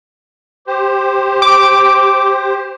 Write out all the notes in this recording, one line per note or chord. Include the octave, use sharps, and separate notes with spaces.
G4 C5
D6